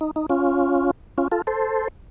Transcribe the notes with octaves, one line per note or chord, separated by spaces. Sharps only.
D#4
D#4
C#4 F4
C#4 F4
F4 A4
A4 C5